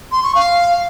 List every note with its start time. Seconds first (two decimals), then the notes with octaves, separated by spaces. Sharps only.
0.12 C6
0.23 C#6
0.35 F5